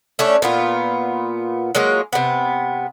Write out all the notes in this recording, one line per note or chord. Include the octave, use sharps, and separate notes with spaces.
A3 C#4 D4
A#2 B3 F4
F#3 G#3 A#3 F4
C3 B3